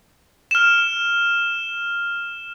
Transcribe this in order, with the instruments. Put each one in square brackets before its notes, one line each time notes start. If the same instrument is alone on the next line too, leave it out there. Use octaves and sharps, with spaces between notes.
[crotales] F6 E7